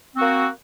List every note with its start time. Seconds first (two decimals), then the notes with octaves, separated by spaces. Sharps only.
0.14 C4
0.18 F#4
0.21 A#3